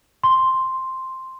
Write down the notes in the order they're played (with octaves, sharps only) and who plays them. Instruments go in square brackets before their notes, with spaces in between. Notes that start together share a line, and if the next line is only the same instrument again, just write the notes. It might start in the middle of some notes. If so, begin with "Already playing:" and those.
[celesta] C6